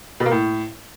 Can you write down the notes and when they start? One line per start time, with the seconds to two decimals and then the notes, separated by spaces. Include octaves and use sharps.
0.20 B2
0.26 A#3
0.31 A2